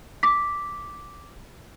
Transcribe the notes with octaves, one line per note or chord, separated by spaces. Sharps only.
D6 B6